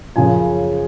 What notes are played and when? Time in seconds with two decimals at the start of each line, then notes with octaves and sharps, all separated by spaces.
0.16 F#2 C#3 F3 G#5